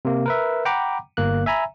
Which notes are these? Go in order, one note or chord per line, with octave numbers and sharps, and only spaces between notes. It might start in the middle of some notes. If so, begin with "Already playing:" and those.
C3 A#3
A#4 B4 E5
F#5 G5 A#5 B5 D6
G1 A#3 F#6
E5 G#5 A#5 B5